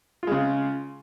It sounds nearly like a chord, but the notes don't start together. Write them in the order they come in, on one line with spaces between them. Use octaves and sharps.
F4 G#3 C#3